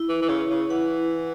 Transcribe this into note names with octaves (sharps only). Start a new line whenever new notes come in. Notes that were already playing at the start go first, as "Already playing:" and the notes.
Already playing: E4
E3
E3
C#3 E4
C#3
E3 F#5